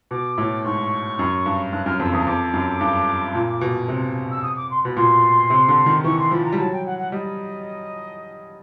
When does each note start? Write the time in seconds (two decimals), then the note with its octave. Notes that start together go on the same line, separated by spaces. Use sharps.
0.11 B2 D6
0.38 A2
0.65 G#2 C#6
1.19 F#2
1.46 G2
1.72 G2 F#6
1.86 F#2 F6
2.00 F2 E6
2.13 E2 D#6
2.26 F2 D6
2.54 F#2
2.81 G2
3.35 A#2
3.61 B2
3.88 C3
4.31 E6
4.42 D#6
4.56 D6
4.70 C6
4.83 B2 B5
4.97 A#2 C6
5.50 C3
5.68 D3
5.86 D#3
6.04 E3 C#6
6.18 C6
6.31 F3 B5
6.44 A#5
6.52 G3
6.59 F#3 A5
6.72 G5
6.86 F#5
6.98 F#5
7.12 G3 D#5